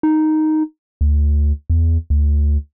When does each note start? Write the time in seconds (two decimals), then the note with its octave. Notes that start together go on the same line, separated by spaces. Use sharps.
0.03 D#4
1.01 D2
1.70 E2
2.10 D2